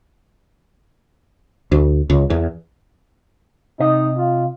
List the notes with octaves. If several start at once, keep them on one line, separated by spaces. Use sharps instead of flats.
D2
C#2
E2
C3 D#4 D#5
F4